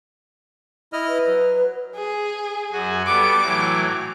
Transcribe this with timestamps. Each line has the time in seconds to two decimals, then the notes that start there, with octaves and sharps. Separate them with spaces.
0.93 E4 D#5 F6
1.09 B4
1.27 F#3
1.96 G#4
2.72 F#2 F#4 G#5
3.07 G3 B3 A4 D6
3.42 A2 E3 F#3